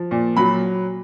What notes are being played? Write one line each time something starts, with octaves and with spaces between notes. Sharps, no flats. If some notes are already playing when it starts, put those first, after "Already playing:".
Already playing: F3
A#2
F#3 B5